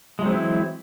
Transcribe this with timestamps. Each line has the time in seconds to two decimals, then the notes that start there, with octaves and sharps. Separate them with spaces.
0.19 G#3
0.22 F#3
0.26 C4
0.29 E3
0.33 E4